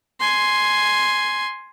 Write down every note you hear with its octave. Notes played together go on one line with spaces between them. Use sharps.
G#5 C6